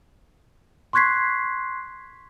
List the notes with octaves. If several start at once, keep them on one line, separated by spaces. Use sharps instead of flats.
C6 C#6 F#6 G#6 B6 C7